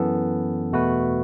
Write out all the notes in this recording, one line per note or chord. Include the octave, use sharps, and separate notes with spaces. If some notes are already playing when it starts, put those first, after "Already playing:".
Already playing: F#2 E3 B3 A4
E2 B2 A3 F#4 B4